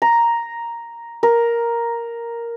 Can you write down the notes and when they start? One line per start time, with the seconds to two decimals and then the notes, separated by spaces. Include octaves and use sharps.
0.02 A#5
1.23 A#4